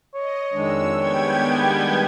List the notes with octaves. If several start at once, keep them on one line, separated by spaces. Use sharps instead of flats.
C#5 D#5
F2 D#3 G#3 D4 E6
G3 B3 G5 G#6